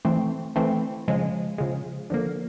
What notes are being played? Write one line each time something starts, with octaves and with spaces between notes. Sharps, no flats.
E3 A3 C4
E3 A3 C4
C#3 F3 G#3
C#3 F3 G#3
D3 F3 A#3